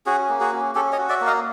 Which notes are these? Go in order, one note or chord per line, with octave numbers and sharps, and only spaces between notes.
C#4 F#4 G#4
A#3
F#4 G#4
C#4
C#4 G4 A4
C#5 D#5
F#4
D5 E5
A#3
D#5 F5